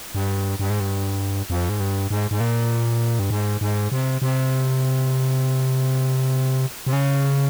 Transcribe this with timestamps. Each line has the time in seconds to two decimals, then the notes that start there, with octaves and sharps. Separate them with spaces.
0.15 G2
0.60 G2
0.70 G#2
0.80 G2
1.50 F2
1.69 G#2
1.80 G2
2.11 G#2
2.31 G#2
2.40 A#2
3.19 G2
3.30 G#2
3.61 G#2
3.92 C3
4.22 C3
6.87 C3
6.93 C#3